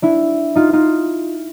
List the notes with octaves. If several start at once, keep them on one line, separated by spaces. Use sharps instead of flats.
D4 E4
D#4 F4
D#4 F4